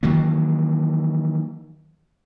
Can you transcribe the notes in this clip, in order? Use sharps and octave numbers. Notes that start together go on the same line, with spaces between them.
D#3 E3 F#3 A#3